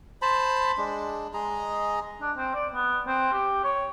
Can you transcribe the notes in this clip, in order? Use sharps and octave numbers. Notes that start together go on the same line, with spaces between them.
C5 A5 B5
G#3 D4
G#3 G#4 D#5 A#5
D4
C4
D5
B3
C4
G4
C#5